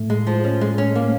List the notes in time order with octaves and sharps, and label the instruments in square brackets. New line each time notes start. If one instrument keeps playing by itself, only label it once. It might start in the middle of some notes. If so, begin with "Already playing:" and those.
Already playing: [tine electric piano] A2 A3
[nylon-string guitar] G#3
F3
C#4
G#3
C#4
A#3